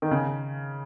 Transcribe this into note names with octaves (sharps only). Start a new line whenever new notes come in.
D#3
C#3